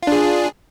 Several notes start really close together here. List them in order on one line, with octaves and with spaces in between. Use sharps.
F4 D4 G#4